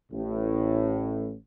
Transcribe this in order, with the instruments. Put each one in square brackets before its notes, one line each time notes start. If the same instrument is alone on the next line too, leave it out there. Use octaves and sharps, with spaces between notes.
[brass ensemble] A1 A2